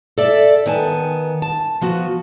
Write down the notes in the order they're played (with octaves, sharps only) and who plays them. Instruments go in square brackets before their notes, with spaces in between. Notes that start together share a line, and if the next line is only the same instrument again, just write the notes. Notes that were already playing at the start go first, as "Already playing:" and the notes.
[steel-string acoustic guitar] A4 D5 E5
D#3 B3 G#5 A5
A5
F3 B3 F#4